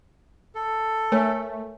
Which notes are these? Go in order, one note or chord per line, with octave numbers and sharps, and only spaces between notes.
A4
A3 A#4 C#5 G#5